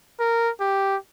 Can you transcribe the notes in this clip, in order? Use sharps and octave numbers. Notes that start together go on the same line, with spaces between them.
A#4
G4